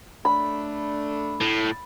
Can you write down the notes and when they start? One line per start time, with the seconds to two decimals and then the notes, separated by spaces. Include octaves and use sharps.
0.25 A3 D4 B5
1.41 A2